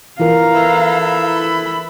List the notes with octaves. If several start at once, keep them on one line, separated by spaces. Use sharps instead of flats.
E3 F4 A#4 F5 A#5
E4 A4 B4
B5